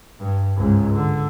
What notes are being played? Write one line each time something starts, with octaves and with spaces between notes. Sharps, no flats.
G2
C#2 G#2
D3